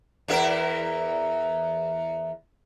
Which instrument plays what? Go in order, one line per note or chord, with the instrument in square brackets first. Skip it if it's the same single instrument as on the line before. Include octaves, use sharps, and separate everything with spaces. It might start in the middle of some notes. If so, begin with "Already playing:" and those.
[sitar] E2 E4 A#4